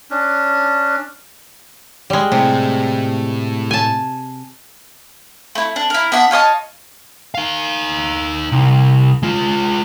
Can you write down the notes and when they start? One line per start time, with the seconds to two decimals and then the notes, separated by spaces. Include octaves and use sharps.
0.11 C#4 D4
2.10 G3 G#3
2.32 A2 C3
3.71 G#5 A5
5.55 A3 E4
5.76 D4
5.90 E4 A#4
6.12 B3 D4 E5 F#5
6.31 F4 C#5 D#5 A5
7.35 D#4 F5
8.52 C2
9.23 G#3 F4